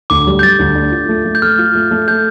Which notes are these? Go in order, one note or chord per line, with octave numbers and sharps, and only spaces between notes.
D2 D6
G3
G6
G3 A6
D2
D4
F4
A3
A3
G6
A3 F6
F4
A3
A3
A4 G6